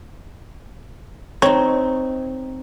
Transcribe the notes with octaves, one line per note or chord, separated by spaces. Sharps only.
C4 D#4 C#5